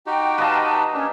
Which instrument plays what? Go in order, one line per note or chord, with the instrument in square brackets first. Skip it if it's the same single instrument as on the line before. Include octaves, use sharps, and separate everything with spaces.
[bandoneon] D#4 F#4 G4 [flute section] G5
[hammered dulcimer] B4 D#5 A#5 [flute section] F5 A5
[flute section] A5
[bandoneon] A#3 D4 [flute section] C#4